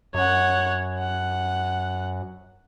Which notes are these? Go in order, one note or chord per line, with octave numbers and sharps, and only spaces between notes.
F#2 C#5 F#5
F#5